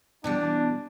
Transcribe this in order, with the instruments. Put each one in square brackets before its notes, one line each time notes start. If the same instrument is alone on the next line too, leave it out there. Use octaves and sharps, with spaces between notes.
[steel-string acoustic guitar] B2 E3 G3 [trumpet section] D4